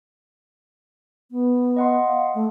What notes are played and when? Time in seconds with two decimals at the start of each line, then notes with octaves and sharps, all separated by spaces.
1.31 B3
1.76 D#5 F#5 C6
2.07 F5
2.35 A3